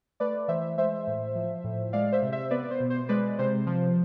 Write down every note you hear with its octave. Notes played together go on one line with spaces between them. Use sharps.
A3 B4 D5
E3 C5 E5
G#3 C5 E5
A2
F3
A2
G#3 D5 F5
C5 E5
C3
C5 E5
B3 B4 D5
C5
B2
C5
G#3 B4 D5
C3 C5
F3